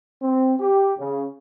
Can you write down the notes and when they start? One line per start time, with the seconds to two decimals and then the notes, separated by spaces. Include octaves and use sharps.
0.21 C4
0.59 G4
0.98 C#3